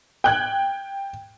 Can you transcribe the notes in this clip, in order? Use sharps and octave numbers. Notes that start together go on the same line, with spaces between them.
G5 F#6 G#6